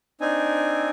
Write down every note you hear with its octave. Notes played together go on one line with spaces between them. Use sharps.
C4 D4 D#4 G#5